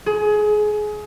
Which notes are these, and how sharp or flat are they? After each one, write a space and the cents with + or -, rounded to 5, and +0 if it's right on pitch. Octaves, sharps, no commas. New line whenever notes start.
G#4 +25